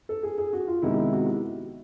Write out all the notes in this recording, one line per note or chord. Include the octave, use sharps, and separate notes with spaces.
A4
G#4
G#4
F#4
F4
C3 D#3 G#3 B3 E4
E4
F#4
G4